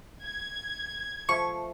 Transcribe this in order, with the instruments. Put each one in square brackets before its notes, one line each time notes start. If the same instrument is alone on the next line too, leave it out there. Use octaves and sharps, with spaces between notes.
[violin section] G#6
[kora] F3 A3 [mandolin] C#6